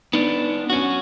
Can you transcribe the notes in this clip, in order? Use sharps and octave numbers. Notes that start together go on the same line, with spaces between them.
B3 D4 D#4
C#4 F#4